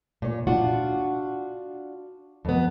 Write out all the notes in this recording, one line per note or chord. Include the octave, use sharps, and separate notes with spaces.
A#2 C#5
D4 F4 F#4 F#5
F2 B3